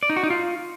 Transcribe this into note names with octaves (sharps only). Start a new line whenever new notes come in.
D5
D#4
F#4
D#4
F4